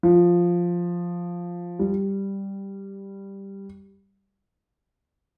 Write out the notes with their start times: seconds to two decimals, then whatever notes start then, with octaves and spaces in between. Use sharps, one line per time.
0.03 F3
1.79 G3